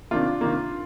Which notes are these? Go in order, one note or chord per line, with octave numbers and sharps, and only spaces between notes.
C3 D#3 A#3 D4 F4
C3 D#3 A#3